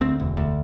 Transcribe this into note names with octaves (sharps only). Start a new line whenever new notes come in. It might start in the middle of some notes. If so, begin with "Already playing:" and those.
D2 C4
E1
D2